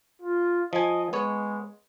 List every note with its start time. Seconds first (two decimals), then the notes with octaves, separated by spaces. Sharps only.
0.22 F4
0.73 F3 D#5 G#5
1.13 G#3 B3 C#5